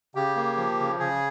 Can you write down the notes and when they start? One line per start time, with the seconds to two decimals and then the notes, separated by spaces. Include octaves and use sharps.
0.15 C#3 G4
0.36 A#3
0.57 F3
0.79 C#3
1.00 C#3 G#4